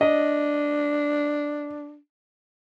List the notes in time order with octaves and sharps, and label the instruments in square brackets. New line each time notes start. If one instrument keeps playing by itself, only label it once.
[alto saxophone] D4 [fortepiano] D#5